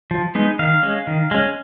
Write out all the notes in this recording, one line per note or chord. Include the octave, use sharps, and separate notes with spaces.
F3
G#3 B3 D#4
D#3 F5
G#3 C#4
D#3
G#3 C#4